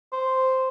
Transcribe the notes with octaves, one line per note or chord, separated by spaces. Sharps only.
C5